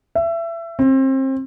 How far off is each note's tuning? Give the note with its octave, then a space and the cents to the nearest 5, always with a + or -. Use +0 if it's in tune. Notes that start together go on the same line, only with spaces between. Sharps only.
E5 +25
C4 +30